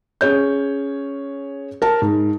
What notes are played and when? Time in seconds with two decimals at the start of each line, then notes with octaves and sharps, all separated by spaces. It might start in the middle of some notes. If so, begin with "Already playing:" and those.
0.21 C#4 G#4 C#5 G6
1.82 A#4 A5
2.02 G#2